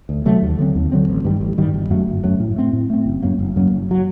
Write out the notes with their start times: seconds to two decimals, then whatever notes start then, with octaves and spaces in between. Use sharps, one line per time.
0.09 D2
0.26 C3 F#3 A3
0.42 D#2
0.58 D3 F#3 C4
0.75 D#2
0.92 D3 F#3 C4
1.08 A1
1.24 G2 D#3 G3
1.41 A1
1.58 G2 D#3 G3
1.74 G1
1.90 F#2 F#3 A3
2.07 G1
2.24 F#2 F#3 A3
2.40 A2
2.56 A3 C4
2.73 A2
2.90 A3 C4
3.06 F#1
3.23 F#2 F#3 A#3
3.39 F#1
3.56 F#2 F#3 A#3
3.72 F#1
3.91 F#3